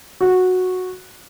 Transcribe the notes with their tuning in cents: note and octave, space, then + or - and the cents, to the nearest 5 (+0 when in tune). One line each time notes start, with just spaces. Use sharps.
F#4 -10